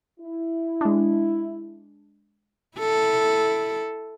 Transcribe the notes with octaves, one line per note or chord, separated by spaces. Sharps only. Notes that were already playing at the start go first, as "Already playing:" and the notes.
E4
G#3 D4
E4 A4